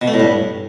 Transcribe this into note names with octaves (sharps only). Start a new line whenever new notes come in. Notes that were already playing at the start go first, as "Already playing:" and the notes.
B2
A3
A2
G2